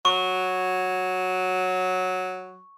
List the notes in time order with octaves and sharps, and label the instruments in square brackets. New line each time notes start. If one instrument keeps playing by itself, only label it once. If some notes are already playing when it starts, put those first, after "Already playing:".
[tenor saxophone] F#3 [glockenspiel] C#6